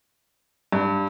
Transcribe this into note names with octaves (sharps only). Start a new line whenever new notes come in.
G2